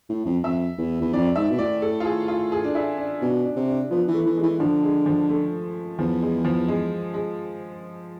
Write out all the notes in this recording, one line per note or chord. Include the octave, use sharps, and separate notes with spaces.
A2
F2
F2 E5
E2
E2
F2 D5
G#2 E5
B2
A2 D5
A4
F4
G#4
F4
G#4
D4
E4
D4
B2 D4
D4
C3
D4
F3 B3
E3
A3
E3
G#3
E3
D3 F3
G#3
F3
A3
E2 F3
G#3
F3
G#3
G#3